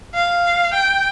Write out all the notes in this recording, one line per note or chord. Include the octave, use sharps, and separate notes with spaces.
F5
G5